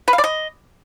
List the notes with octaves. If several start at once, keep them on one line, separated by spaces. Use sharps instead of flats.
B4
F5
D5
D#5